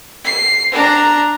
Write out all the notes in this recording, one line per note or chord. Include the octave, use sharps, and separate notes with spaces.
C7
D4 A#5